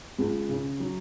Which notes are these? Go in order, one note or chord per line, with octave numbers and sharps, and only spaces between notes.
C#2
C#3
F#3